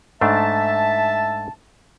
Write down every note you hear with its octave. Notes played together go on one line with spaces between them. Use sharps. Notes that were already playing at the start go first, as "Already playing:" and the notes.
G#2 A3 D4 E5 A5